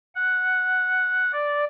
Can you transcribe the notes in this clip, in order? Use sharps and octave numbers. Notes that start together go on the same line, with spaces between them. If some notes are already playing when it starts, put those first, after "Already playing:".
F#5
D5